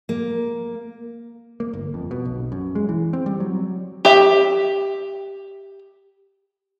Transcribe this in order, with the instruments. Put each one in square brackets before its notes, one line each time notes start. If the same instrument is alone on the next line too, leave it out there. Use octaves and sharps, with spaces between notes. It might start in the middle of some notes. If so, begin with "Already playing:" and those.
[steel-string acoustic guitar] A#3
[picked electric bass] A#3
G1
F2
B2
B1
F#2
G#3
E3
C4
G3
F#3
[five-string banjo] G4 E5